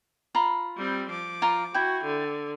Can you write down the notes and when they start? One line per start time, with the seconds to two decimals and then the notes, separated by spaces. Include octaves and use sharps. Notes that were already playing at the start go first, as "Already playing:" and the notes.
0.35 F4 A#5 B5
0.77 G3 C4
1.10 F3 D6
1.42 F4 A#5
1.74 E4 F#4 G5
2.04 D3